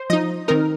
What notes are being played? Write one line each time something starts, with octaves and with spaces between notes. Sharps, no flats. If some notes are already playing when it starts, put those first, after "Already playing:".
Already playing: C5
F3 D#4 D#5
D#3 C4 D#4 A#4